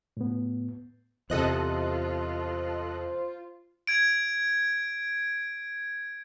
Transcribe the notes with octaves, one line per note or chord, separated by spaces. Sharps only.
A2 B3
E2 C3 F4 A4 C5 D#5 F#6
G#6 D7